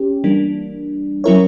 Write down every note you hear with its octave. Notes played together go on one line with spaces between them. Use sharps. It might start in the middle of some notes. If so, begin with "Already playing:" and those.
Already playing: C#4 G4
E3 G3 A#3 D4
F#3 C#4 E4 A#4 C#5